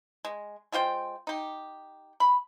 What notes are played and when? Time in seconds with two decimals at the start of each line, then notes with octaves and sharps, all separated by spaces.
0.25 G#3
0.72 G#3 F4 C5 G5
1.27 D#4 G4
2.20 B5